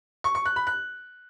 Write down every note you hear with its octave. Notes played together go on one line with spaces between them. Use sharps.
C#6
C#6
F#6
B5
F#6